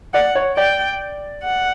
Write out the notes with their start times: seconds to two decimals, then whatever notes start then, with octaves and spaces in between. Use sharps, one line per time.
0.14 D5 F#5
0.35 C#5
0.57 D5 G5
1.44 F#5